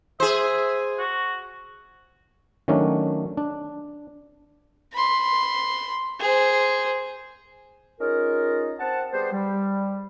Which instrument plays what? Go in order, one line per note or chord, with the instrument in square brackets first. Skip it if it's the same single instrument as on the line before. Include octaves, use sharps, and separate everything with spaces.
[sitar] G#4 C5 [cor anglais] E5
[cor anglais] F#4
[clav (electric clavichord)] D#3 F#3 A3 C#4 D4
D4
[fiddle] B5 C6
G#4 C5
[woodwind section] C#4 D#4 F4 G#4 A#4
C4 F#5 A5
G3 B3 G#4 C5
G3